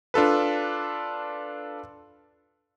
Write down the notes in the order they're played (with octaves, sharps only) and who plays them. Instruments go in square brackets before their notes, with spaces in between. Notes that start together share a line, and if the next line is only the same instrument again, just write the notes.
[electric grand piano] D4 F4 A4 B4